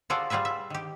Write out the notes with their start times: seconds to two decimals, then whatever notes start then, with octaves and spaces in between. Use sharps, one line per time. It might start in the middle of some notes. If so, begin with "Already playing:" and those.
0.10 F4 F#4 G#4 A4 D5
0.30 G3 F4 G#4 B4 E5
0.45 E5
0.70 D#3 G4